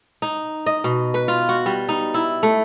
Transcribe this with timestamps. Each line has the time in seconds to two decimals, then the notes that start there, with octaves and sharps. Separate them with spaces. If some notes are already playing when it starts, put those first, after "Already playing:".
0.22 D#4
0.66 D#5
0.84 B2
1.14 B4
1.28 F4
1.49 F#4
1.66 G3
1.89 D#4
2.14 E4
2.43 A3